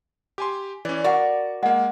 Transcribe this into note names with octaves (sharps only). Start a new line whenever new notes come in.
G4 G#5 C6 D6
E3 C#4 D5
F#4 A#4 D5 F5 F#5 C#6
G#3 A#3 D#5 F#5